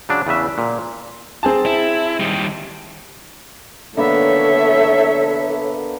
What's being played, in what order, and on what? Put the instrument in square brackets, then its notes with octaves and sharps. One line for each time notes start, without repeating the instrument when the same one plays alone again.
[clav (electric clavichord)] C#3 F#3 D4
E2 C#3 B4 E5
A#2
[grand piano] C4 G#4 A5
[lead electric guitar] E4
D#3 G3
[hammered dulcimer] D3 A#3 B3 [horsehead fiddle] A4 C#5 [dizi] E5